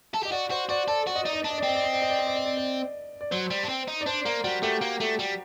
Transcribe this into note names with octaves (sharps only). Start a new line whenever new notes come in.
A4
G4 D#5
F#4 D5
F#4 C5
F#4 D5
A4 D5
F#4 D5
D#5
D#4 D5
D#5
D4 D5
D#5
D5
C4 D#5
D5
D#5
D5
D#5
D5
D#5
D5
D#5
D5
D5
D5
F#3 C5
G3
D4
C4
D#4
D5
D4 C5
A#3 A#4
G3 F#4
A3 G4
A#3
A3
G3